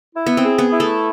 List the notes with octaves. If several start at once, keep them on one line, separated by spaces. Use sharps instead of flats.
E4
B3
C4
G#4
B3
E4
A3